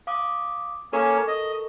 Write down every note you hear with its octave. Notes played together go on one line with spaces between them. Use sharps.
F5 D6 D#6
A#3 C#4 A4 A#4 C#5 C#6
D#5